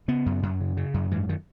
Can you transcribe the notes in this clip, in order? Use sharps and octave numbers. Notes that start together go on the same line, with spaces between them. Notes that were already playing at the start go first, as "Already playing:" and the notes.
C#3 B3
F#2
F#2
C#3
C#3
F#2
G#2 E3
D#3